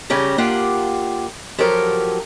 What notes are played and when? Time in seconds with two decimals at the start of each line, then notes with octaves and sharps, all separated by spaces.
0.10 C#3 G3 C#4 G4 A#5
0.38 A#3 D4 F4 G4 F#5
1.58 F3 F#3 G4 A4 A#4